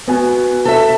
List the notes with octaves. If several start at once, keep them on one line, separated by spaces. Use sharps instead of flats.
B3 F#4 G#5
A4 E5